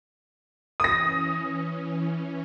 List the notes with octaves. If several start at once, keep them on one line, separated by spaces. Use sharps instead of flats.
E3 C#4 D#6 A#6